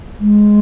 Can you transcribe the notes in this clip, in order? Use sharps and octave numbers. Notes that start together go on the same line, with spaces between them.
G#3